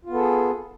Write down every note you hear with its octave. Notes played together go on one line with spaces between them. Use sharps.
B3 F4 G#4 A4